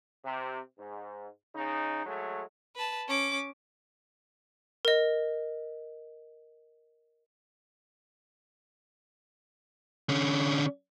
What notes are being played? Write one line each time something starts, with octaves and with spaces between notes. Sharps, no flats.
C3
G#2
C#3 D#4
F#3 G#3 A3
B4 A5
C#4 D6
A#4 D#5
D3 C#4